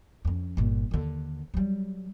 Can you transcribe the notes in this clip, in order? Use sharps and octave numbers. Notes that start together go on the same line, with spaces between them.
F2 C#4
G1 A#2
D#2 D3
F#3 G3